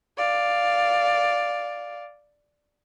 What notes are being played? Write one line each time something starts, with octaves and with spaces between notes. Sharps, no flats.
D5 F5